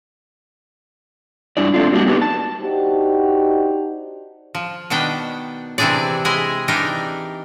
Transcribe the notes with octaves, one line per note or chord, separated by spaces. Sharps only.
G2 D4 E4 D5
A3 C4 D4 F4
F#3 G3 A#3 D4 F#4 G4
B3 D#4 F#4 G4 A4 B4
A5
D4 D#4 F#4 G4 C5
F3
B2 D#3 B3 D4 G5
C3 E3 C4 D4 G#4 D5
G#3 E4 G#4 D#5 G#5
E3 D4 D#4 G4 A#4